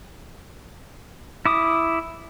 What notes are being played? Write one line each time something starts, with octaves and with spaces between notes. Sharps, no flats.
E4 D6 D#6